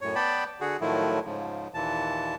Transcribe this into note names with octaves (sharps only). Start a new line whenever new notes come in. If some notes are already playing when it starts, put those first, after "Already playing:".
F#2 A2 C#5
B3 D5 G5 A5 B5
D3 F#4 G#4
A2 D#3 F3 F#3 A3 E4
G#2 C#3 F3
D#2 A#2 E3 A5